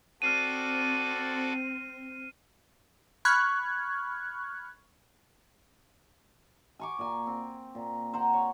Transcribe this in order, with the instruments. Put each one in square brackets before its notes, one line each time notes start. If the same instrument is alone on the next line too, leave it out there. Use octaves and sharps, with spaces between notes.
[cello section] C4 [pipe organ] F#4 A4 D5 [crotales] F6 C7 D#7
[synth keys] B5 C#6 F6 F#6 G#6
[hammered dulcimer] G#5 C#6 D6
A#2 G#5
C4
A#2
C5 F#5 G5 A#5
C#5